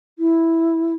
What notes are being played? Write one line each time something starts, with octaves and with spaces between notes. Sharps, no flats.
E4